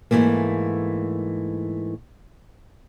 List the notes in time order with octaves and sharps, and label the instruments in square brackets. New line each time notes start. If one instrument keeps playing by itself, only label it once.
[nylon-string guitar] G#2 B2 E3 A3 A#3